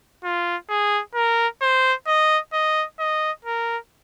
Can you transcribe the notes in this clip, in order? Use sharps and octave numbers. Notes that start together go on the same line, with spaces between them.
F4
G#4
A#4
C5
D#5
D#5
D#5
A#4